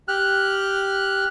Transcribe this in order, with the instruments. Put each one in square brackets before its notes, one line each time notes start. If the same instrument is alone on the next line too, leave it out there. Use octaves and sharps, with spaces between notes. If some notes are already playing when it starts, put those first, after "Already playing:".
[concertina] G4 F6 F#6